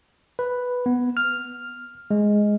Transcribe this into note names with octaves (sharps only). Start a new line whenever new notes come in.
B4
B3
F6
G#3